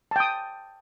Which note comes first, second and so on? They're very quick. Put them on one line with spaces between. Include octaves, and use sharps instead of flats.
A5 G5 D#6